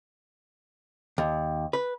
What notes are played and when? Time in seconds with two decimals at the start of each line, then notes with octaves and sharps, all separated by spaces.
1.18 D#2
1.73 B4